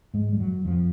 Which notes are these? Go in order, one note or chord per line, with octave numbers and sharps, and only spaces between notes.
G#2 G#3
G3
F#2 F#3
F2 F3